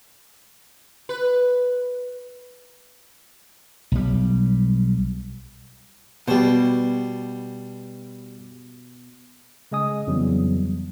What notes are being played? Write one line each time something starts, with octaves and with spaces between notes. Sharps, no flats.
B4
B1 G3
B2 G3 C5
C#3 G#3 D#5 G#5 D#6
F2 C#3 E3 F#3 G3 B3